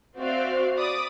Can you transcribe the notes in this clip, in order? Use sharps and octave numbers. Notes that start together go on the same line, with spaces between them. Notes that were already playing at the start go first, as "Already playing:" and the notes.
C4 F#4 C5 D5 E5 F5
D5 B5 D6 D#6